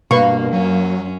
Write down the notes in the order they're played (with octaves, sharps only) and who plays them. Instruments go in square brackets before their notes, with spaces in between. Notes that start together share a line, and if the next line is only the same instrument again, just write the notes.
[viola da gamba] G2 [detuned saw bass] B2 [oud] A#3 [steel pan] B4 C#6
[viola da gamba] F#2 C#4 [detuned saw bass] F#3